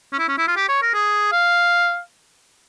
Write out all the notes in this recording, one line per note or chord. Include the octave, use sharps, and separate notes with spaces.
C#4
E4
C#4
E4
F4
G4
C#5
A#4
G#4
F5